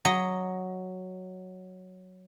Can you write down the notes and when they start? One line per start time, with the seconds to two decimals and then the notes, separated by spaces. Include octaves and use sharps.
0.05 F#3 D#5